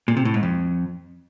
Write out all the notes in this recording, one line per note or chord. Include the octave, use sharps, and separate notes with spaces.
A#2
C3
A2
G#2
F2